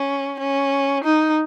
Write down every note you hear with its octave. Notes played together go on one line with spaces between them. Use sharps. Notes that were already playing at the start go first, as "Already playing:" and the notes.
Already playing: C#4
C#4
D#4